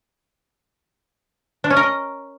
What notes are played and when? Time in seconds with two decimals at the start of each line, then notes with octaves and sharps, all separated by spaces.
1.64 D4
1.70 C#4
1.77 A#4
1.83 D#5